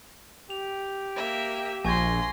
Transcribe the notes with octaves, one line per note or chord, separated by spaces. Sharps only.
G4 F7
A#3 E5
A#1 G#5 C6 C#6 G#6 A#6